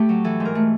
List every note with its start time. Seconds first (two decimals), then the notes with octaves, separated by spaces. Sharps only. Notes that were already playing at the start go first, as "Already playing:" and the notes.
Already playing: A2 A3 G4
0.09 F#3
0.24 E3 A4
0.40 G#2
0.45 A#4
0.55 A3